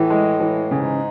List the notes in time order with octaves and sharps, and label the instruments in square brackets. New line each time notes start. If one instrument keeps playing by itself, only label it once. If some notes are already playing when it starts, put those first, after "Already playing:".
Already playing: [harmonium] A2 [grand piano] E3
[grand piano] G#3
E3
[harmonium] G#2 [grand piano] C#3